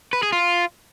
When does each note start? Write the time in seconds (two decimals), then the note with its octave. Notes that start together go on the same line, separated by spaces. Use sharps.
0.13 B4
0.23 G#4
0.33 F4